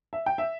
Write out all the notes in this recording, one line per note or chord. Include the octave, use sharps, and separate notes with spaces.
E5
G5
E5